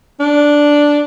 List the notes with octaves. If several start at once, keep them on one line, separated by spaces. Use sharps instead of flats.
D4